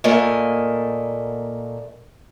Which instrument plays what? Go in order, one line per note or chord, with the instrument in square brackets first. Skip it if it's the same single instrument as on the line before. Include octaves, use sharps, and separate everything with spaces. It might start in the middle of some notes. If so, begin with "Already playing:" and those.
[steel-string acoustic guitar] A#2 A3 A#3 D#5 G#5